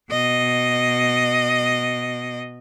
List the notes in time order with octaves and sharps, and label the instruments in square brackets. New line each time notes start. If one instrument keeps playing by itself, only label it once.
[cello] B2 D#5